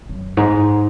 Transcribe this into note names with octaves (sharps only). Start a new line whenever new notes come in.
F#2
G#2